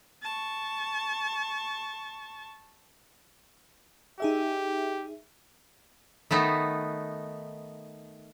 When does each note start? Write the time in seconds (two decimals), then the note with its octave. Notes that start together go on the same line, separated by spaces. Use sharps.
0.23 A5 C#6
4.20 D#4 G4 G#4 E5
6.31 D#3 A3 B3 D#4